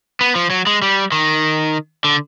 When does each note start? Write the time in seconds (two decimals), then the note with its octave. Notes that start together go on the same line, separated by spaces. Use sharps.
0.21 B3
0.35 F3
0.50 F#3
0.67 G#3
0.82 G3
1.12 D#3
2.04 D3